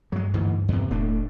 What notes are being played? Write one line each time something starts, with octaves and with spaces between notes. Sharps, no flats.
G2 F#3 G#3
D2 G#2 E3
E2 C3
E1 A2 A3 D4